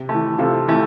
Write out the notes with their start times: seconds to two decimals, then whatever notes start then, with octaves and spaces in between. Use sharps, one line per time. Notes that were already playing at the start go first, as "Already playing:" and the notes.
Already playing: C3
0.09 A3
0.14 E3
0.38 C3 F4 A4
0.68 E3 A3